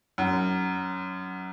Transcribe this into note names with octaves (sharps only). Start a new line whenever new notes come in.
F#2